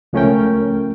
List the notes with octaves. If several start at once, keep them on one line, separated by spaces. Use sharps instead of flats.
C#2 F3 A3 C#4 A#4 G5